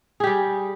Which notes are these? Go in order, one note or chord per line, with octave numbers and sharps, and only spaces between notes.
G3 G4 G#4